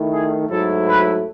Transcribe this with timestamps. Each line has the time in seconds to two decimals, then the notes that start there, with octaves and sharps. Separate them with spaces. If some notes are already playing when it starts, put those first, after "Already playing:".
Already playing: D#3 A3 E4
0.10 G#4
0.49 G#2 F#3 A3 E4 A4
0.87 B4